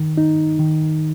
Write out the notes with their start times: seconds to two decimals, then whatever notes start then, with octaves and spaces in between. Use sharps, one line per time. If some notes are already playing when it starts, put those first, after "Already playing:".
Already playing: D#3
0.17 D#4
0.59 D#3